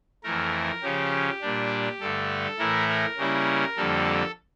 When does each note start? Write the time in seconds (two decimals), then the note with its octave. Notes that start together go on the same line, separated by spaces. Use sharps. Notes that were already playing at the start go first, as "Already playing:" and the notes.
0.24 F2 E3 A3 A#4
0.82 C#3 F3 C#4 G4
1.41 A#2 G3 D4
2.00 G2 D3 A3 A4
2.59 A2 E3 A3 E4 A#4
2.89 A#4
3.18 C#3 G3 A#3 C#4 E4
3.77 F2 D3 G3 A#3 A4